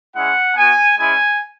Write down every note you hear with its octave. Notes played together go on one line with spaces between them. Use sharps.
G#3 C#4 E4 F#5
B3 F#4 G#5
G#3 C#4 E4 G#5